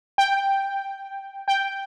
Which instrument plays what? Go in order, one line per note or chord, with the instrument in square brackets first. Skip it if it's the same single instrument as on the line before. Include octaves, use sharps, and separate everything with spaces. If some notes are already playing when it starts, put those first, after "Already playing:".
[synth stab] G5
G5